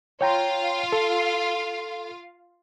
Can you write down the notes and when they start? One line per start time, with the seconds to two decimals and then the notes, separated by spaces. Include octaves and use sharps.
0.21 F4 C#5 F5 G5 A#5
0.92 A4